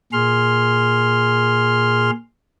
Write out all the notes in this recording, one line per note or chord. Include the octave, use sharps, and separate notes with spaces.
A#2 G#4 C6 F6